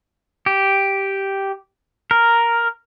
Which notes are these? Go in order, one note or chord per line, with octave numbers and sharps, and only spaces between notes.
G4
A#4